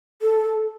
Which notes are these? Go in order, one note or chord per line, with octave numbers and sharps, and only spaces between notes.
A4